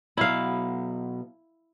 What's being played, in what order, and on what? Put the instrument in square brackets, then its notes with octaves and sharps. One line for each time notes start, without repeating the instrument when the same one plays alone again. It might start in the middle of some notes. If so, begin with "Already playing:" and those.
[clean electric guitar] B2 F#3 B5 [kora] E4 F5